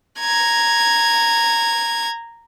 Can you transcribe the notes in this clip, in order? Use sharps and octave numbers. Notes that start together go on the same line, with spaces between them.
A#5 G#6